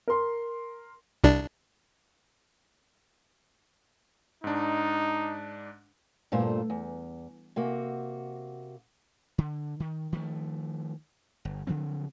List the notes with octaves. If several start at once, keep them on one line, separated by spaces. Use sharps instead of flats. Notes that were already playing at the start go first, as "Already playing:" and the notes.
A#4 C6
C2 D4
G#2 D4 D#4
G2 A#2 A3 F4 C5
E2
C3 A#3 F#4
D3
D#3
D#3 F3 G#3 A3
G1
C#3 F3 F#3 C4